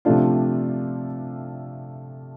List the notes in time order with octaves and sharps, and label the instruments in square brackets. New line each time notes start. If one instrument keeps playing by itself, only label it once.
[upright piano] C3 F3 A3 D4 F4